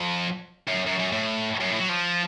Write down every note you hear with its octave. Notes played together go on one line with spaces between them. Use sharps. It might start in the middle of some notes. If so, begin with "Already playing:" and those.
Already playing: F2
F#2
F#2
F#2
A2
F#2
A2
F#3
F3